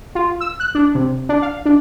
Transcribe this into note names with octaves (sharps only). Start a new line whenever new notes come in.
F4
E6
F#6
D4
C3
D4
F5
D4